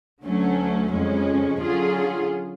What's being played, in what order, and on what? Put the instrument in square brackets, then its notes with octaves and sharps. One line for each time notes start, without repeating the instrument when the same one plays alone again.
[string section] D2 D3 F#3 A3 C#4
F2 C#3 G#3 C#4
D3 F#3 C#4 F4 G#4